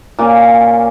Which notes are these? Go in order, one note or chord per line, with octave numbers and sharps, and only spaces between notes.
A#2 A#3 C#4